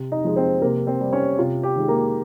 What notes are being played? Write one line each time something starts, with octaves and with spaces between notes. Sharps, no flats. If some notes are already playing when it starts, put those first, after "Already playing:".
Already playing: C3
D#4 D#5
F3 G#3
C4 C5
C3 A#3 A#4
C4 C5
G3
C#4 C#5
C3 F4
G4
D#3 G#3
A#3 A#4